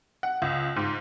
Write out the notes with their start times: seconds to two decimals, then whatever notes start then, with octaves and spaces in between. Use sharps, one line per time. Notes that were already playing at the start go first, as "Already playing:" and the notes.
0.23 F#5
0.42 C#2
0.76 G#2